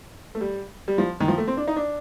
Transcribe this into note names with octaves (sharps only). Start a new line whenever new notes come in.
A3
G3
G3
F3
D#3
F3
A3
C4
D4
D#4
D4